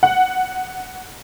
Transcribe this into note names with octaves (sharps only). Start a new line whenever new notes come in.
F#5